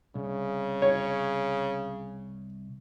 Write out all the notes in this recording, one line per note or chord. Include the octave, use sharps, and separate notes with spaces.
C2 C#3
C#5